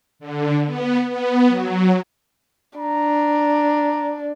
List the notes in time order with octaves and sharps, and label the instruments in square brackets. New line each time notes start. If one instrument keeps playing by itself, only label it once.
[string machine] D3
B3
B3
F#3
[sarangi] D4 [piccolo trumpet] A#5